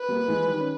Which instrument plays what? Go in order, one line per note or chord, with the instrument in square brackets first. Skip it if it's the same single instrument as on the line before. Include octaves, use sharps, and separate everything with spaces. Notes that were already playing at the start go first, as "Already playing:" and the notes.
Already playing: [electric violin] B4
[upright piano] G3 A#3
E3 G#3
D#3 G3
C#4